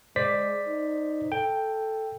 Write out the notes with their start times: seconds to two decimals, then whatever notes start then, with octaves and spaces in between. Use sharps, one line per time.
0.16 G#3 C5 D5 B6
0.67 D#4
1.32 A4 G5